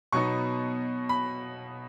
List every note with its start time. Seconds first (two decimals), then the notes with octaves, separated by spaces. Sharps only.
0.12 B2 F#3 B3 D#4 C#6
1.09 B5